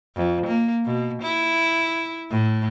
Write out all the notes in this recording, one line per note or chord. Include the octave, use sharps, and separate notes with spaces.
F2
A#3
B2
E4
A2